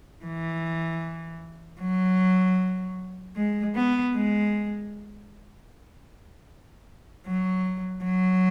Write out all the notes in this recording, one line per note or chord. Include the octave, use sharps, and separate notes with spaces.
E3
F#3
G#3
B3
G#3
F#3
F#3